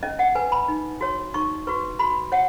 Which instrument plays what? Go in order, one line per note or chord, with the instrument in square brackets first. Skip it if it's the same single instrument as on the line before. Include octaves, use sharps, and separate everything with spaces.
[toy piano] C#4 D#5
F#5
B4 G#5
B5
D#4
F#4 C#5
D#4 C#6
F#4 B4 C#6
F#4 B5
C#5 F#5